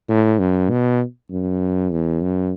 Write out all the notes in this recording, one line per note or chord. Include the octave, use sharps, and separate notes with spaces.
A2
F#2
B2
F#2
E2
F#2